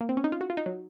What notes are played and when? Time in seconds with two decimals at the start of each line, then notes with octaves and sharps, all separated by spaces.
0.01 A#3
0.09 C4
0.17 C#4
0.24 D#4
0.32 F4
0.41 F#4
0.50 F4
0.57 D#4
0.66 F#3